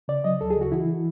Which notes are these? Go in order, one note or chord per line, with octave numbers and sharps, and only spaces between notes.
C#3 D5
F#3 D#5
D2 A4
G#4
C#3
F#4
E3 E4